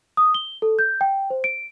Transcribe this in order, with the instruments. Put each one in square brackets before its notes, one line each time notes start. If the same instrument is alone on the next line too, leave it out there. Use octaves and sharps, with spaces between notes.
[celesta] D#6
G7
A4
G6
G5
C5
D7